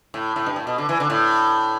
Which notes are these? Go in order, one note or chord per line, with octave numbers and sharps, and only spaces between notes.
A2
A2
G2
A2
B2
D3
E3
D3
A2